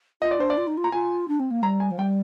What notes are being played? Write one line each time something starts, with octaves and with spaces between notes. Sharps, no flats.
F4 D#5
D5
D4 C5
D5
F4
D#4
F4
A#5
F4 G#5
D4
C4
A#3
G3 A#5
G#5
F3
G3 G5